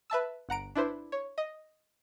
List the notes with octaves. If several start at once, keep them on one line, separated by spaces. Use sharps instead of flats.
B4 E5 A5 E6
G1 F#5 A#5 D7
D4 E4 B4 C5
C#5
D#5